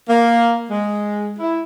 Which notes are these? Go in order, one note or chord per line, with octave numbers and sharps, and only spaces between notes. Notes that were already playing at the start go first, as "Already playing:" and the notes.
A#3
G#3
E4